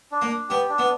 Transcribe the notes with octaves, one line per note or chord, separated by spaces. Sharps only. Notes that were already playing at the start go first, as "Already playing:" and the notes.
D4
A#3
D4
B3 G4
D4
B3